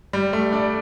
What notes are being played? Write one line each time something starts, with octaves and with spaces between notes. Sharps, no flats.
G3
A3
D4